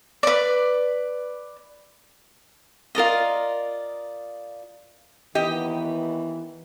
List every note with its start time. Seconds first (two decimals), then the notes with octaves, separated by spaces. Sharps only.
0.23 B4 D5
2.95 F4 A#4 D5 D#5
5.35 D#2 D#3 E3 B3 G4 D#5